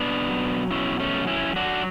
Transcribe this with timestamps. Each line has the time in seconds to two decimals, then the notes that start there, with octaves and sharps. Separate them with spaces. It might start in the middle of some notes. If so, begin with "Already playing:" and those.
Already playing: B2 B3 D4
0.28 F#3
0.71 B2 C#4 E4
1.00 A3 C#4
1.13 F#3
1.27 C#4 E4
1.56 F#3 D4 F#4